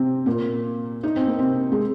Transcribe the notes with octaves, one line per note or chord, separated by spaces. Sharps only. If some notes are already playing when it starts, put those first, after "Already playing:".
Already playing: C3 C4
A#2 A#3
D#4
C4
A#3
C3 C4
G#3